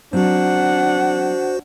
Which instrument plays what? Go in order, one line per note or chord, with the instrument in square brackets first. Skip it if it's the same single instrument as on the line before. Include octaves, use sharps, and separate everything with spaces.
[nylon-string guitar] F#3 C4 [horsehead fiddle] D4 F#5 [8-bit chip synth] F#4 C5